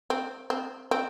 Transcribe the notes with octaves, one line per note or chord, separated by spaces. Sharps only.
C4
C4
C4